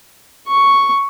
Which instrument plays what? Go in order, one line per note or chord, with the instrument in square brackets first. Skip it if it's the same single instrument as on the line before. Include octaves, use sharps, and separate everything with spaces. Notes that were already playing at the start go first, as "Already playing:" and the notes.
[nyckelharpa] C#6